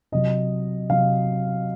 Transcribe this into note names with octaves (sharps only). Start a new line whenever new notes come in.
C3 F#3 D#5
C3 F#3 F5